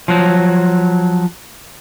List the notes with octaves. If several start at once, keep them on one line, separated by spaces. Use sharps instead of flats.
F3 F#3